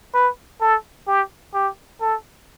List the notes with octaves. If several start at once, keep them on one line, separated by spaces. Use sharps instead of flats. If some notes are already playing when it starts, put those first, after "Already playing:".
B4
A4
G4
G4
A4